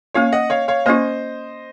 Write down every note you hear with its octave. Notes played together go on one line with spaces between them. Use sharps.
A#3 C#4 F4 C#5 F5
D#5 F#5
C#5 F5
C#5 F5
A#3 C#4 F4 C5 D#5